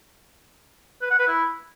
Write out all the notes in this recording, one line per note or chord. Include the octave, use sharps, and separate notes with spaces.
B4
F#5
B4
E4